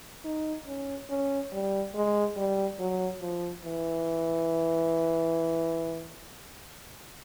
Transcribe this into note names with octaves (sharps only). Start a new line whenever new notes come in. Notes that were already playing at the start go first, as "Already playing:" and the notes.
D#4
C#4
C#4
G3
G#3
G3
F#3
F3
E3